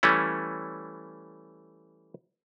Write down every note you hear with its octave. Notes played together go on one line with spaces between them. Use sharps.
E3 G3 A3 C#4